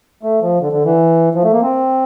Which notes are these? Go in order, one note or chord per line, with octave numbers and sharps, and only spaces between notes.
A3
F3
D3
D3
E3
F3
A3
A#3
C4